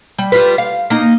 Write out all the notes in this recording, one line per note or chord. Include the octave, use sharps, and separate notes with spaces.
G3
G3 F4 B4
F5
A#3 D#4